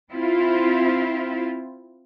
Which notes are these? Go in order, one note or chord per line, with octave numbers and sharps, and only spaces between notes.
C4 E4 F4